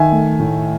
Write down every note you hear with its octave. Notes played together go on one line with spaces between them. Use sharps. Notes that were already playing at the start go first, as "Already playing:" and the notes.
Already playing: D#3 E5 G#5
A3
A2